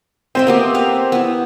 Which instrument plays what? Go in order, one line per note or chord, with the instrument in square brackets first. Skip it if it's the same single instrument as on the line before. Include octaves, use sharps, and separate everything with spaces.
[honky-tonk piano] C4 [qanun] D#5 E5 G5
[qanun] A#3 B3 G4
B4 F5
B3 E4